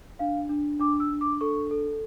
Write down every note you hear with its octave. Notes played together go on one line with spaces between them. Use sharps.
D4 F5
D4
D4 D6
E6
D4
D6
A4 C#6
A4